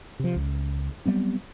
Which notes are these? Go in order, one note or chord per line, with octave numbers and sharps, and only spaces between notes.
C3 F3
C#2
F#3 G3 B3 C4